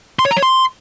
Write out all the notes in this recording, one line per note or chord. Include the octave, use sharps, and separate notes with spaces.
C6
C#5
A#5
C#5
C6